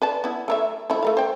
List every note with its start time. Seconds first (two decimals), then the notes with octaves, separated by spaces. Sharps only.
0.02 B4 D5 A5
0.24 B3 E4
0.48 A3 A#4 E5
0.90 F3 A3 E4
1.03 A3 A#4 F5
1.17 C5 G5